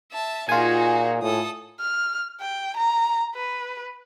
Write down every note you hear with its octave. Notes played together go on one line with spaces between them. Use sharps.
E5 A5
A#2 D#4 F4 F#4 G#4 G#5
A2 A4 D#6
F6
G5
A#5
B4